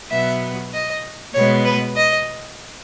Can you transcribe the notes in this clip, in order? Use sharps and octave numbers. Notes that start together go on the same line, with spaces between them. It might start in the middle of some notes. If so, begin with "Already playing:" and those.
B2 F#3 B3 E5
D#5
B2 G#3 B3 C#5
B4
D#5